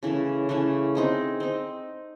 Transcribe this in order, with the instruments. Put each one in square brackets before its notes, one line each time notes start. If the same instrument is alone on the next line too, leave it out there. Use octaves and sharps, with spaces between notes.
[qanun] C#3 E3 A3 C#4
C#3 E3 A3 C#4
C4 D#4 G#4
C4 D#4